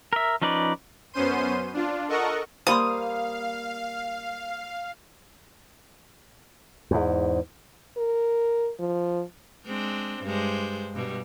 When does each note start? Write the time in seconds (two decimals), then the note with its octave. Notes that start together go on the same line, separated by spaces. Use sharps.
0.13 A#4 E5
0.42 F3 C#4 D#4 B4 D5
1.13 F#2 B3 C#4 C5 C6 D#7
1.74 D4 F4
2.08 A4 A#4 D#5 F#5 C#6
2.67 G3 A#3 C5 F5 B5 C6 D#6
6.91 E2 G#2
7.98 A#4
8.80 F3
9.65 G#3 C4 D4
10.24 G2 G#3 C5
10.93 G2 B2 G3